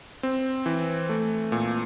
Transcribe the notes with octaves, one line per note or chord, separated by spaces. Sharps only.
C4
E3
A3
A#2